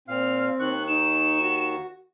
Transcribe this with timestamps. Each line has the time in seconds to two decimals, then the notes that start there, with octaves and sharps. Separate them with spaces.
0.08 A#2 C4 F5 F6
0.60 D#2 D#3 C#6 F#6
0.87 D#4 E7
1.42 F#4